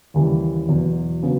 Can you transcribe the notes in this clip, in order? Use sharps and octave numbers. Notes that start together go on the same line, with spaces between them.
D#2 C#3 E3 G3
E2 B2 F#3 B3
C#3 F#3 B3